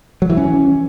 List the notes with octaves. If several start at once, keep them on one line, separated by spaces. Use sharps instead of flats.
F#3
E3
C#4